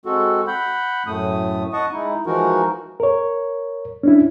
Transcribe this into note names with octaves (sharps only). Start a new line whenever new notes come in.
G#3 C4 F#4 A4
F#5 B5 G6
F#2 A2 A3 D#6
D#5 F#5 A5 C#6 D#6
G#3 D#4 E4
E3 F3 G#3 D#4 F#4 A#4
A#4 C#5
C#4 D4 E4